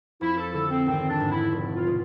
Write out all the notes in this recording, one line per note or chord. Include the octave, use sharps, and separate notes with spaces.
F2 E4
A4
D3 A3 A4
C4
G#1 C4
D4
G#2 G#3 B3
E4
F1
F4
B2 G#3